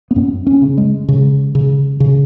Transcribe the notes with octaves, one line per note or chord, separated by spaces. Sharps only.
B3
F#2 C#4
C#4
C#3
G#3
C#3
C#3
C#3